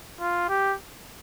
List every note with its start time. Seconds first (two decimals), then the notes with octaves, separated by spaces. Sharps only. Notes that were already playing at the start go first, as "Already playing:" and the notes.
0.20 F4
0.49 G4